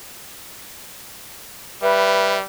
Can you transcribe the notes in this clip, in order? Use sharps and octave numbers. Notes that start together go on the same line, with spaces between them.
G3 B4 E5